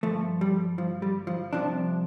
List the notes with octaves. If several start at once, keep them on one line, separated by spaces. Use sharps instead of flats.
G2 F3 A3
G3
F3
G3
F3
C2 C3 F3 D4